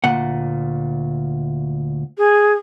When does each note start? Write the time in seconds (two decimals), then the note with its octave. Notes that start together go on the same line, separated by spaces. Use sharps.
0.04 D2 A#2 F#5
2.17 G#4